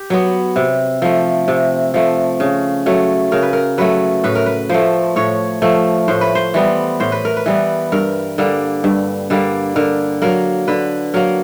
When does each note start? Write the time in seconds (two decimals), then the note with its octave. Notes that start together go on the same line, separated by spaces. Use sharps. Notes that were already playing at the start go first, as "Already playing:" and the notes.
Already playing: G4
0.10 F#3 B3
0.56 C3
1.02 F3 A3
1.48 C3
1.94 F3 A3
2.40 C#3
2.86 F#3 A3
3.32 C#3 A#4
3.43 B4
3.53 A#4
3.78 F#3 A3 B4
4.24 A2 B4
4.35 A#4
4.46 B4
4.69 F3 A3 C5
5.16 A2 C#5
5.62 F3 A3
6.08 A2 C5
6.21 B4
6.35 C5
6.54 E3 G3 B3
7.00 A2 C5
7.12 B4
7.25 A#4
7.37 B4
7.46 E3 G3 B3
7.92 G2 A#4
8.38 D3 G3 A#3
8.84 G2
9.30 D3 G3 A#3
9.76 D3 A#4
10.22 F#3 A#3 A#4
10.68 D3 B4
11.14 F#3 A#3 A#4